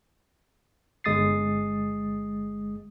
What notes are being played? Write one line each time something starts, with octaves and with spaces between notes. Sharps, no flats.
G1 G#3 D#6 A6 C7